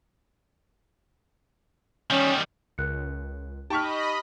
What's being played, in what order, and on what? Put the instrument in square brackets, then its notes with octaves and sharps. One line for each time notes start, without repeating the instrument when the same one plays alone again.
[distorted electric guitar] D#3 G3 [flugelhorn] C#4
[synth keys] C#2 [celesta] A#4 F#6 C#7
[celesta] D#4 B6 [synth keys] G4 [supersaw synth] D#5 B5 [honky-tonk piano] A5 C#6 F6